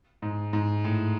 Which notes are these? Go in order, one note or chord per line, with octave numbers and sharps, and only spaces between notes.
G#2
G#2
A2